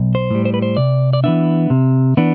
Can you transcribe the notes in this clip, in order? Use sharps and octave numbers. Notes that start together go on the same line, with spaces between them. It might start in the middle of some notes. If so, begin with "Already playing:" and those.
Already playing: B1
C5
A2 G3
C5
B4
C5
C3 D5
D5
E3 B3 D4 E5
C3
E3 B3 D4